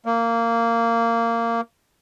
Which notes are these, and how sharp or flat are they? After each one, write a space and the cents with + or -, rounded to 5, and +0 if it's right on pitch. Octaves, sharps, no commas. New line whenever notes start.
A#3 -15